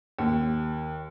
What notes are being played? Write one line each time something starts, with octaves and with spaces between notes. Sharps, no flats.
D#2